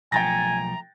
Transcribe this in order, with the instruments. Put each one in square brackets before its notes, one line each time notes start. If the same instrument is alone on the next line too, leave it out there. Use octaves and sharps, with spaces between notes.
[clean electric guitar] B1 F3 A3 [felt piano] G5 A6 A#6 [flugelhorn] G#5 [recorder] A#5